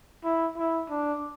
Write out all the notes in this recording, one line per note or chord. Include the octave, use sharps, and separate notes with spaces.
E4
E4
D4